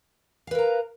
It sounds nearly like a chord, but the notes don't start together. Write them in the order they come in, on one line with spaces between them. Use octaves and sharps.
F5 B4 A#4 A#5